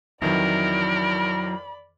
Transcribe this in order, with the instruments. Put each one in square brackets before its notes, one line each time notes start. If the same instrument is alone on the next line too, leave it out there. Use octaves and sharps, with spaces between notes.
[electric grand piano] F2 D#3 E3 [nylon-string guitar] F#3 E4 [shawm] A#4 [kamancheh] D5 B5